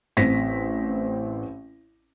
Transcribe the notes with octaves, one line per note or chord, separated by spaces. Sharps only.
A1 C4 A#6 B6